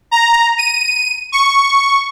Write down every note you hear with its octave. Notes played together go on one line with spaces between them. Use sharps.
A#5
D#7
C#6